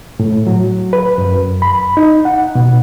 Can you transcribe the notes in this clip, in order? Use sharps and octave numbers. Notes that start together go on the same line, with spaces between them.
A2
F#3
B4
F#2
B5
D#4
F#5
B2